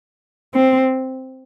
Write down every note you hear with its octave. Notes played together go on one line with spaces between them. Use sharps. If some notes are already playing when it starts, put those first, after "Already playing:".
C4